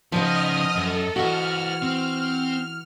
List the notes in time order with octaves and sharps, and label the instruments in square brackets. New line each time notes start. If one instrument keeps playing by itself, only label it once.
[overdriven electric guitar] C#3 D#4 [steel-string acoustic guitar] F3 B3 [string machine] D#5 D#6 F6
[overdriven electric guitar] F#2 [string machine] A4
[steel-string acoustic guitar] E3 F#4 [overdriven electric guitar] C5 D#5 [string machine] F6
[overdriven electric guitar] C4